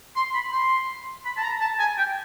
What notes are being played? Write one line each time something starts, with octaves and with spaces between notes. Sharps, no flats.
C6
B5
C6
B5
A5
A#5
A5
G#5
G5